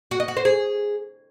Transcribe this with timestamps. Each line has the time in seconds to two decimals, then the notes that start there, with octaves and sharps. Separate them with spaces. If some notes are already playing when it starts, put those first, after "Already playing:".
0.11 F#4
0.20 D#5
0.28 F#4
0.37 C5
0.45 G#4